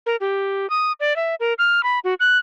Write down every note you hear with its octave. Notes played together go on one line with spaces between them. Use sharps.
A#4
G4
D#6
D5
E5
A#4
F6
B5
F#4
F#6